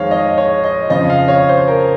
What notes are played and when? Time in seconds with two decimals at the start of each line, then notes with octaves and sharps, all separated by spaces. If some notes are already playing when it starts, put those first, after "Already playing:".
Already playing: F2 D#3 G#3 C5 C#5 F5
0.11 D#5
0.38 C#5
0.64 D#5
0.89 F2 C#3 F3 D#5
1.10 F5
1.28 C#5
1.49 C5
1.68 A#4